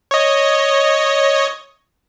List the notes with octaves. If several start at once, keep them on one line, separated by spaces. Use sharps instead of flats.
C#5 D#5